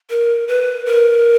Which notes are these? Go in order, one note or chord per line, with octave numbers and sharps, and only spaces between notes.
A#4
B4
A#4